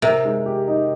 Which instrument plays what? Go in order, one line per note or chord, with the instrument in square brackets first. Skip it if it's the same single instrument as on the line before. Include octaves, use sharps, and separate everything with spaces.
[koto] C3 [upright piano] A#4
[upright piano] G#3
G4
D#4